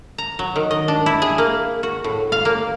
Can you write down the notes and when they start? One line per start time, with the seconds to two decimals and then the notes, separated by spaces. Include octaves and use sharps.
0.18 A#5
0.39 F#3
0.56 D#3
0.71 D#5
0.88 D4
1.06 E4
1.22 G#4
1.38 A#3
1.83 F#4
2.04 A2
2.32 F5
2.45 A#3